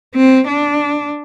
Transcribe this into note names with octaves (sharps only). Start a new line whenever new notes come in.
C4
D4